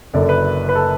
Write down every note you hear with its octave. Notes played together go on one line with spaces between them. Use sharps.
F#1 F#2 D3 D5
B4
B4
A4